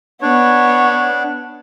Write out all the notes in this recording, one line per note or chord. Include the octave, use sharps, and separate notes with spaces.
B3 D4 C#5